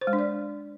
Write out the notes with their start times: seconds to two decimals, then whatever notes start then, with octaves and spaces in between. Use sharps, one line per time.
0.01 C5
0.07 G#3
0.13 D4
0.19 D5